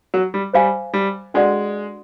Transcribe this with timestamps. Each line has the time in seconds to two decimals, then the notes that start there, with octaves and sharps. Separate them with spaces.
0.14 F#3
0.34 G3
0.53 G3 C5 F5 G#5
0.94 G3
1.34 G#3 D4 F#4 A4 D5 F#5